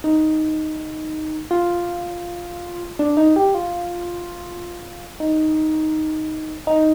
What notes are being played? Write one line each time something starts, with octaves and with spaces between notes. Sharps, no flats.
D#4
F4
D4
D#4
G4
F4
D#4
D#4